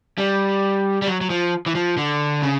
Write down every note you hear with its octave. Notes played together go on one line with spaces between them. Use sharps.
G3
G3
F#3
F#3
F3
E3
F3
D3
C#3